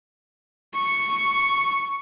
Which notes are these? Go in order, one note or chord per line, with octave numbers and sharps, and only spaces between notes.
C#6